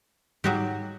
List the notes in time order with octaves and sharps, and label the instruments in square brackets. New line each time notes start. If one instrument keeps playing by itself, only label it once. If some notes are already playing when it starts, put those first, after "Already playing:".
[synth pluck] G#2 G3 D#4 [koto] F#3 F#4 G4